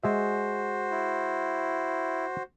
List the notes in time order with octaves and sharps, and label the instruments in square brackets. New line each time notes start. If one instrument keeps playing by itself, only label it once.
[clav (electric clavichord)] G#3 G#4 E5 [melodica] F#4 C5
[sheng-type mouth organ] E4